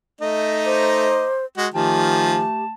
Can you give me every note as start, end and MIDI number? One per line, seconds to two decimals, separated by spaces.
0.21 1.26 57
0.21 1.26 63
0.21 1.26 75
0.66 1.45 72
0.66 1.35 82
0.66 1.35 86
1.57 1.68 56
1.57 1.68 66
1.74 2.44 51
1.74 2.44 53
1.74 2.74 57
1.74 2.64 67
1.74 2.44 80
1.74 2.74 81